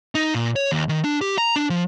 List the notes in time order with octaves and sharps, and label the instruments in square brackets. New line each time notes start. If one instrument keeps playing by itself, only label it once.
[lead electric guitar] D#4
A#2
C#5
D#2
D#3
D4
G4
A#5
D4
F3